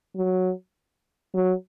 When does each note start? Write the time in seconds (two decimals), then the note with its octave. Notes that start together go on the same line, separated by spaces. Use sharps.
0.16 F#3
1.34 F#3